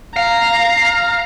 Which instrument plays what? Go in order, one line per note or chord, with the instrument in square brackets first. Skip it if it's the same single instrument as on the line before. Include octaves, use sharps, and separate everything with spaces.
[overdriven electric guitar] F5 [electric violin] A#5